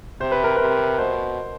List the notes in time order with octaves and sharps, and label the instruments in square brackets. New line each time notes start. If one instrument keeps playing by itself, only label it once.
[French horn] C3 [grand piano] C5
[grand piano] B4
A#4
[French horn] C3 [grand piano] B4
[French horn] B2 [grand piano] C5